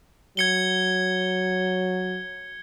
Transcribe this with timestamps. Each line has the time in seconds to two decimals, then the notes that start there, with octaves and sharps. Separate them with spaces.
0.37 F#3 G#6 C#7 G7